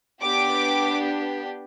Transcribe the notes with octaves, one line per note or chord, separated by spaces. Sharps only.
B3 D4 G4 D6